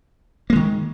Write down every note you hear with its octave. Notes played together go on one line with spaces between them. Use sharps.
D#3 G#3 A#3